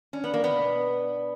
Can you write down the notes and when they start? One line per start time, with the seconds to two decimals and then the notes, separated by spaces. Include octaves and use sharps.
0.13 C#4 D4
0.24 B3
0.34 A#3
0.44 B3
0.51 B2
0.88 D4